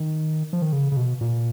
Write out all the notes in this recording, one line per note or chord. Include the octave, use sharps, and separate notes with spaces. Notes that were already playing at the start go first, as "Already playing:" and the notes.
Already playing: D#3
F3
D#3
C#3
C#3
B2
A#2